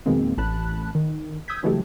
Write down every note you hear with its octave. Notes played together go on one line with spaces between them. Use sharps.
F2 B2 D#3 G#3 A#3 C4
A1 A5 B5 F#6
D#3
D#6 E6 G6 G#6 B6
C#3 E3 F#3 G#3 A3 G4